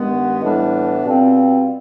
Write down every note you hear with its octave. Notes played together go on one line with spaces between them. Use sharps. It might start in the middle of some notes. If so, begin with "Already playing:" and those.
Already playing: G2 D#3 G#3 B3
A2 E3 G3 B3 D4
B2 G3 C4 F4